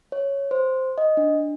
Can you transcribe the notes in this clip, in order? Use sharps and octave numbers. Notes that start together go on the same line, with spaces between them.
C#5
C5
D#5
D4